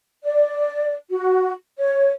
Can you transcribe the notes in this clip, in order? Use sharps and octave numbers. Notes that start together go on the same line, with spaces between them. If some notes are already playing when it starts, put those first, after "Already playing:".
D5
F#4
C#5